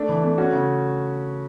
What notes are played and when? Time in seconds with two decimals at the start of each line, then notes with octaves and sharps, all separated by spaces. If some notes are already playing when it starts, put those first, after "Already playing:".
Already playing: A3 D4
0.09 E3
0.23 A3
0.38 C#4 F#4
0.52 C#3